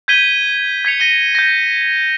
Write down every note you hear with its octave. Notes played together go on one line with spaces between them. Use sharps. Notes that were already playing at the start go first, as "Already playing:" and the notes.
G6 G#6 B6 D#7 G7
G#6 B6 C#7 F7
A#6 D#7 G7
G6 A#6